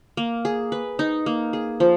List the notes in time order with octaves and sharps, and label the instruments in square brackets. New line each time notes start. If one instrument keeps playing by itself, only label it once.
[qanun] A#3
G#4
B4
D#4
A#3
G#4
F3